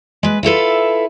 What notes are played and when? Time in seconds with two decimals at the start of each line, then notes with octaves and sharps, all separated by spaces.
0.23 G#3 B4
0.43 E4 F4 A4 B4